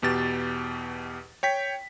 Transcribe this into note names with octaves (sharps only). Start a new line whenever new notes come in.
E2 B2 G4 A6
C#5 G5 B6